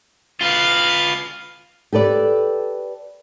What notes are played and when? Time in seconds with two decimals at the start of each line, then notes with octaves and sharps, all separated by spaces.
0.41 F4 B4 F5
1.93 G4 A4 B4 D5